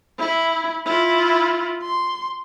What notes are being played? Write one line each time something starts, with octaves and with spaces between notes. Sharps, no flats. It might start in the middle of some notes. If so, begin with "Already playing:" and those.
E4
E4 F4
C6